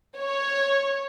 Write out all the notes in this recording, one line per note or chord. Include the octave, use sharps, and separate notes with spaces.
C#5